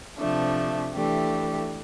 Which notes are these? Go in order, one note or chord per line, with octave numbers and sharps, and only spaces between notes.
C3 F3 A3 D4
E3 A3 D4 G4